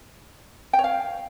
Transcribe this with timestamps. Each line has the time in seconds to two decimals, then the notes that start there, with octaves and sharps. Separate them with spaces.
0.73 G5
0.79 C#5
0.84 F5